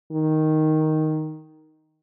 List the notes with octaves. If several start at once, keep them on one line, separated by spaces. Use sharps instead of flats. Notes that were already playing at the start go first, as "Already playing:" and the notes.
D#3